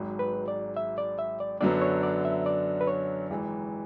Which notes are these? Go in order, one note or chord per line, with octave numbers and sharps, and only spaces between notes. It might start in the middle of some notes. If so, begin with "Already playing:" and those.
Already playing: G#1 G#2 F#3
B4
D5
E5
D5
E5
D5
F#2 D3 F#3 B3 D5
C#5
D5
E5
D5
B4
C#5
G#1 G#2 E3